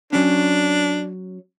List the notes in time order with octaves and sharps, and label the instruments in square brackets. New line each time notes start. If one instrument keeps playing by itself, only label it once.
[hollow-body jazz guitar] F#3 C#4 [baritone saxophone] D4